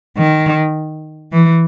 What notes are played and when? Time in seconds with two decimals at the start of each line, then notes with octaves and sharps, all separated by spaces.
0.17 D#3
1.32 E3